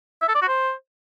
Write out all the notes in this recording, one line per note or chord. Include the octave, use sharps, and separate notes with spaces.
E5
A4
D5
F#4
C5